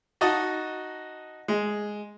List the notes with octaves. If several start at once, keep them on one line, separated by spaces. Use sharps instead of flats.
D#4 F#4 D#5 A5
G#3